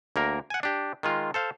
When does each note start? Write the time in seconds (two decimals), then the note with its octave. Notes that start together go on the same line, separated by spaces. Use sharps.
0.16 D2 A#3 A#4
0.50 F#5 G#5
0.63 D4 G4
1.03 D#3 G#3 F4
1.34 A4 C5 F5